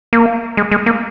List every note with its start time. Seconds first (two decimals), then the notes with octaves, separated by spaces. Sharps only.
0.13 A#3
0.57 G#3
0.71 G#3
0.86 A#3